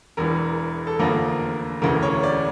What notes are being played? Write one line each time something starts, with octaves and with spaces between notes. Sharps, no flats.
E1 E2 E3 A#4
A4
F1 E2 D3 F3 A#3 A#4
E1 D2 C#3 E3 A#4
C#5
D5